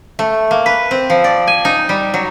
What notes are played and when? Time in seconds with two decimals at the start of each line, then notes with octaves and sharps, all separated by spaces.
0.19 A3
0.51 A#3
0.66 B4
0.91 C4
1.10 F3
1.24 D5
1.47 G#5
1.65 D#4
1.89 G3
2.14 F#3